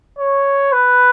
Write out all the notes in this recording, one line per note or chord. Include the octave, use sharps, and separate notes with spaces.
C#5
B4